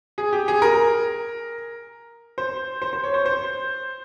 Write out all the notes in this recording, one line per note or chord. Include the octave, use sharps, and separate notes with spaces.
G#4
G4
G#4
A#4
C5
C5
C5
C#5
C5
C5